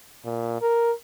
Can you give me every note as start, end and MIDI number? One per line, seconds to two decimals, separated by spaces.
0.25 0.61 46
0.62 0.92 70